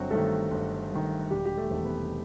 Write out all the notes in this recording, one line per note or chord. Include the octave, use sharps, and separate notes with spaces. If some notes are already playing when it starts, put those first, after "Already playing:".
Already playing: G1 F#3 C4 F#4
G2 D#3 A3 A4
G1
G2 D#3
E1 G3 G4
G4
A3 A4
E2 C3 D#3
B3 B4